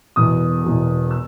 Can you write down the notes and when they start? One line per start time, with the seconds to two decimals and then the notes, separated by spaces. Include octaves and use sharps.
0.16 E1 E2 B2 D#6
0.64 E1 E2 B2
1.11 E6